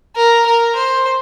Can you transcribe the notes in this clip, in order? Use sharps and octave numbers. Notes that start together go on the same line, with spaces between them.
A#4
A#4
C5